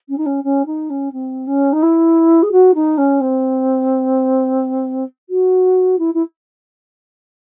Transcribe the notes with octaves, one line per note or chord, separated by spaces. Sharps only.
C#4
D#4
C#4
C#4
D#4
C#4
C4
C#4
D#4
E4
G#4
F#4
D#4
C#4
C4
F#4
E4
E4